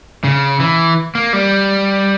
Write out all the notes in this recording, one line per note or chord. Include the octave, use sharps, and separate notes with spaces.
C#3
E3
A#3
G3